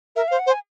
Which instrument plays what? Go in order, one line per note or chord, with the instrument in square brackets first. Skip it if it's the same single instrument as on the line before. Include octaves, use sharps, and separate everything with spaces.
[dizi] A#4 [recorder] E5
[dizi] C5 [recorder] F5
[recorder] F#5
[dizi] C5
[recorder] G#5